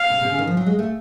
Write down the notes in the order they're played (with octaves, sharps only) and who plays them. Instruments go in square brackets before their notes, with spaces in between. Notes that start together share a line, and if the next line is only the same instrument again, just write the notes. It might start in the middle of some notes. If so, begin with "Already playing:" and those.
Already playing: [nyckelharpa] F5
[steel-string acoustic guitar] C3
C3
C#3
D#3
F3
F#3
G#3
A3